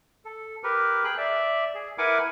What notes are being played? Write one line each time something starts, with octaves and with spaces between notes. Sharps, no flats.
A4
G4 A#4 B4
G#4 G5 F#6
D5 E5
G#4
E4 A#4 B4 F#5 G#5 D6